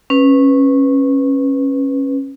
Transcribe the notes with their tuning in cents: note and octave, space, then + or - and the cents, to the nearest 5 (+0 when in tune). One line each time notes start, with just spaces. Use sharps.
C#4 -20 B4 +0